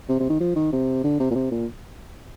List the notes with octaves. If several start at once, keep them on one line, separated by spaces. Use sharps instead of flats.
C3
C3
D#3
F3
D#3
C3
D3
C3
A#2
C3
A#2